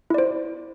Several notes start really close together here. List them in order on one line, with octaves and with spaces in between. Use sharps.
E4 D5 C5